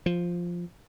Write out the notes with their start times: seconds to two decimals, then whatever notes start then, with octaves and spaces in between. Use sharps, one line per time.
0.06 F3